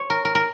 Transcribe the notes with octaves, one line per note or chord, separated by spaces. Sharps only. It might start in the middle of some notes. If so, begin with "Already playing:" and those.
Already playing: C#5
A#4
A#4
A#4